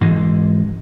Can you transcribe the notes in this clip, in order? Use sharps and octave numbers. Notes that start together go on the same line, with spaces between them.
G#2 E3 G#3